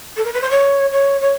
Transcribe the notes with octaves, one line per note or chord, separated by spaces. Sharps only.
A4
A#4
B4
C5
C#5
C#5
C#5